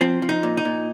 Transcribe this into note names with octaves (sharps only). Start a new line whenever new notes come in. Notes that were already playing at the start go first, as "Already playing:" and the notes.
F3 C4
F3
D#4
A#2
D#4
A#2